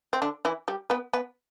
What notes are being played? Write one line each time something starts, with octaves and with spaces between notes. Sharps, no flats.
C4
D3 D4
E3 E4
G3 G4
B3 B4
B3 B4